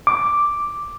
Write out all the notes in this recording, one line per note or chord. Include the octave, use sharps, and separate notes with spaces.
D6